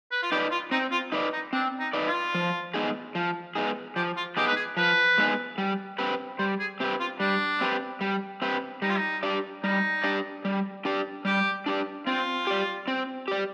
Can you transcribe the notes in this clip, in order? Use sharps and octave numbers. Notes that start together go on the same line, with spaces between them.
B4
F4
D#4 G4 B4 D5
F4
C4 D#4
F4
D#4 B4 D5
D#4
C4 D4
D#4
D#4 B4 D5
F4
F3
G#3 B3 D#4 G#4
F3
G#3 B3 D#4 G#4
F3 G4
F4
G#3 B3 D#4 G4 G#4
B4
G#4
F3 B4
G#3 B3 D#4 G#4
G3
C4 G4 B4
G3 C5
G#4
C4 G4 B4
F4
G3 D4
C4 G4 B4
G3
C4 G4 B4
G3 D#4
F4
D#4
D4 G4 D5
G3 D#4
D4 G4 D5
G3
D4 G4 D5
G3 G4
D4 G4 D5
C4 F4
G4 D5
C4
G4 D5